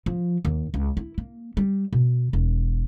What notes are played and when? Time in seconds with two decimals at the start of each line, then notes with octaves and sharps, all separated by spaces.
0.06 F3
0.45 D#2
0.74 C#2
0.97 E4
1.18 A#3
1.57 G3
1.93 B2
2.33 E1